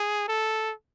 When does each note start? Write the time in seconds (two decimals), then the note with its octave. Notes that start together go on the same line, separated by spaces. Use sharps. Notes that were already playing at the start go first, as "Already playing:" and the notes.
Already playing: G#4
0.28 A4